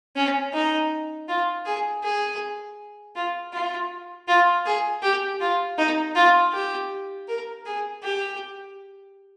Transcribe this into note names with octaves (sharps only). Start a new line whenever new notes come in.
C#4
D#4
F4
G#4
G#4
F4
F4
F4
G#4
G4
F4
D#4
F4
G4
A#4
G#4
G4